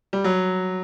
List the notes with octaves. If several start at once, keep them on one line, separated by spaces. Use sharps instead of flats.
G3
F#3